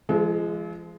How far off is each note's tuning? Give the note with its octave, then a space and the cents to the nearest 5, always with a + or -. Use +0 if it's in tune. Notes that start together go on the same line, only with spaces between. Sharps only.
F3 -40 G#3 +0 A4 -40